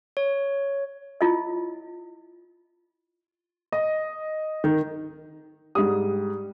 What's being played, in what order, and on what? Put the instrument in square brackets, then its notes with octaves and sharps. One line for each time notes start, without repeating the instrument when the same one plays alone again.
[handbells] C#5
[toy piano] E4 F4 D#5
[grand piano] D#5
D#3
[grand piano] G#2 D#6 [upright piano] G3